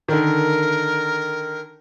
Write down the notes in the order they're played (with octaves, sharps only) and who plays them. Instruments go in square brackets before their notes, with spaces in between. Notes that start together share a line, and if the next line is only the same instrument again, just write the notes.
[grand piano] D3 D#3 [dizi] A#4